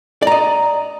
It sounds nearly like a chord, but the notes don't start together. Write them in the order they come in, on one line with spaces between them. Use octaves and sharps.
D5 A#5 D#5